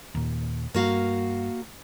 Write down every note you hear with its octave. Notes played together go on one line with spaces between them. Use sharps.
D#2 A#2
G2 A#3 F#4 F5